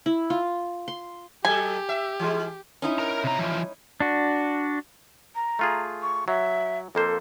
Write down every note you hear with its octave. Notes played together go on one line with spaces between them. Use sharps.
E4
F4
C6
F#3 G4 A4 G#5
E5
E3 G#3
C#4 D#4 E4
A#4 A#5
C3 A#5
E3 F3
D4 F#4
A#5
A3 F4 G#4
C#6
F#3 E5
F2 A#3 A4 C5